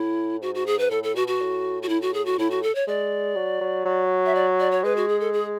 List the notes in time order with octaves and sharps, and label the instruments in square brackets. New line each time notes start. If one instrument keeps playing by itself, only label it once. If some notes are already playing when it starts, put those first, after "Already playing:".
Already playing: [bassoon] A2 [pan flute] E4
[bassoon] G#2 [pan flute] F#4
[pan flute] F#4
G#4
B4
[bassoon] A2 [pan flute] A4
[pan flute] A4
[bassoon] B2 [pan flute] F#4
[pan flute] F#4
[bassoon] A2
[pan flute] F#4
E4
F#4
G#4
F#4
[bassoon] A2 [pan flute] E4
[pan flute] F#4
A4
C#5
[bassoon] G#3 [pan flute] D5
[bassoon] F#3
F#3
F#3
[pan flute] E5
D5
D5
C#5
[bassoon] G#3 [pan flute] B4
[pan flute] F#4
G#4
A4
G#4